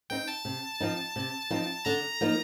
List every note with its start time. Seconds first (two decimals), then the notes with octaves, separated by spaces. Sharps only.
0.10 C4 D#4 G5
0.28 A5
0.45 C3
0.80 F3 C4 D#4
1.16 C3
1.50 F3 C4 D#4
1.85 D3 A#5
2.21 F3 A#3 D#4